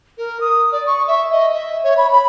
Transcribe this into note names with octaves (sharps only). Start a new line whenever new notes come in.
A#4
D#6
D5
C#6
E5
D#5
E5
C#5
B5
B5